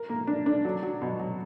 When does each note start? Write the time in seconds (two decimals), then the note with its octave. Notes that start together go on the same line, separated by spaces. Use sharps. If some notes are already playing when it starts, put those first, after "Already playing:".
Already playing: A#4
0.10 A#3
0.27 D4
0.46 D4
0.65 F#3
0.83 F#3
1.02 B2
1.20 F#3